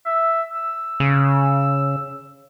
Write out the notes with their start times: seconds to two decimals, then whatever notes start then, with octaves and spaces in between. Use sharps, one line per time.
0.06 E5
0.55 E6
1.00 C#3